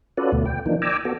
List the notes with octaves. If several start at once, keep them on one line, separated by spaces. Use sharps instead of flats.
C#4 F4 F#4 A4 B4 D5
D2 B2 A3
G5
E3 F3 A#3 D4 D#4
D5 G5 G#5 A#5 D6 E6
B3 F#4 A4